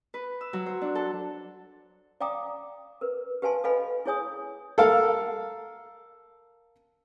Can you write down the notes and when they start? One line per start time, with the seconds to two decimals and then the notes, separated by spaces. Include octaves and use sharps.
0.14 B4
0.41 E6
0.53 F#3
0.66 C5
0.81 D4
0.95 A4
2.21 D5 F5 G5 A#5 D6 D#6
3.01 A#4 B4
3.42 G4 B4 F5 G#5 A5 C6
3.64 A4 B4 D#5 F5 G#5 B5
4.06 E4 G#4 C#5 G#5 D#6
4.78 A4 A#4 F5